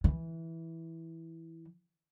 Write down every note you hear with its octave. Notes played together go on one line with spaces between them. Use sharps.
E3